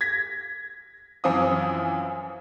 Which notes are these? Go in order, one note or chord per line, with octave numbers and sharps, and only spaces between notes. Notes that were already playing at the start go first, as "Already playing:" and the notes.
G#6 A#6 B6
F#2 E3 F3 C4 F5 D#6